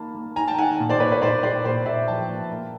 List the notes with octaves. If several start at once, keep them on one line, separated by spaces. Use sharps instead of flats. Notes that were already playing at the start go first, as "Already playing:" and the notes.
Already playing: D#3 A#3 A5 B5
A#3
D#3 G#5 A#5
G5 A5
D#3 F#5 G#5
A#2
C5 D5
A#2 B4 C#5
B4 C#5
A#2 C5 D5
G#3 C5 D5
A#2 C5 D5
A#2 D5 E5
F3 G5 A5
A#2
A#3